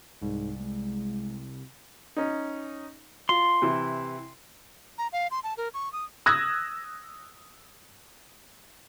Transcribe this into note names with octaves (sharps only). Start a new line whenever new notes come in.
C2 G#2
G#3
C#4 D#4
F4 C6
C3 E3 E4
A#5
F5
C6
A5
A#4
C#6
D#6
D#6 E6 F#6 G#6 A#6